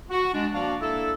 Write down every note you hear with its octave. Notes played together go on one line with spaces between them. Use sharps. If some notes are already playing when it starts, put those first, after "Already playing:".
F#4
G#3 D4
F3 A#3 D4 F#4 D5 F5
A#3 D4 E4 A4